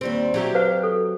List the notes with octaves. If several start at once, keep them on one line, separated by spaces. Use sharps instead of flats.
D#2 G3 C4
F#3 G4 E5
B4 C5 F5
A4